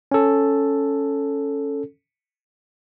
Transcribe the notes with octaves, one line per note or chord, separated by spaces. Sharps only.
C#4 A4